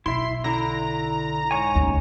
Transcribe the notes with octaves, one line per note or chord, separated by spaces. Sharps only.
B1 E4 E5 C6
D3 E4 A#5
G#2 C#5 G#5
D#2 C#3